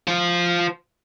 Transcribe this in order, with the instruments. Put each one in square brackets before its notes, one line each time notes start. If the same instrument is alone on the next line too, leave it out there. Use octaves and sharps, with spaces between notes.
[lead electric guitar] F4 C5